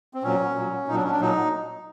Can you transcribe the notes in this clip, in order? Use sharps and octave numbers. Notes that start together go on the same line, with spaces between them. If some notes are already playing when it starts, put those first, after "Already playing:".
C4
A#2 F#3 C#4
A#2 F#3
A#2 D#4
F#3 D4
C#4
D4
A#2 F#3 D#4